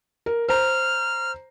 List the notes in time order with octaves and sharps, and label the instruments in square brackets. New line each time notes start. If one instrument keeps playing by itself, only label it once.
[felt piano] A#4
[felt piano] C5 A#5 [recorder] F6